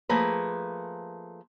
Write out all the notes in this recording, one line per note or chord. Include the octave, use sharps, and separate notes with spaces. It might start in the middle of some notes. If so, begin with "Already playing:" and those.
F3 A3 A#3 G#4 B4